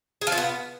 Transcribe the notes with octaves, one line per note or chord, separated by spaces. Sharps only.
G#4
F3
F4
B3